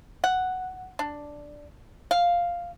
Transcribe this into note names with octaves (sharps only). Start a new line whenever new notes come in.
F#5
D4
F5